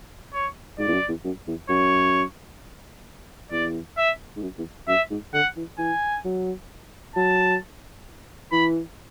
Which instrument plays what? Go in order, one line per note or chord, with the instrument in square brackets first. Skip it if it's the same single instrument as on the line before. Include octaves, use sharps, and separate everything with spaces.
[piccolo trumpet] C#5
[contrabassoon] G#2 [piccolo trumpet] D5
[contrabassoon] E2
F#2
E2
F#2
E2
[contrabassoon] F#2 [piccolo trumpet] C#5
[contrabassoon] E2 [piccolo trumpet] D5
[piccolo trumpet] E5
[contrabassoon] G#2
F#2
E2
[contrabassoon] F#2 [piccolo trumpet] E5
[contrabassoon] G#2
[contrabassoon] D3 [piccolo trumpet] F#5
[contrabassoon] E3
[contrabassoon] E3 [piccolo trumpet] G#5
[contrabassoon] F#3
[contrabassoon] F#3 [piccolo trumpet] A5
[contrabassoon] E3 [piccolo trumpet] B5